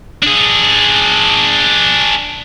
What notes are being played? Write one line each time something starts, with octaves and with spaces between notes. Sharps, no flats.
D4 G#4